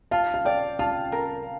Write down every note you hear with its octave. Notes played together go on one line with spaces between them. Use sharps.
F4 F5 A5
F5
D5 G5
F4 F5 A5
A#4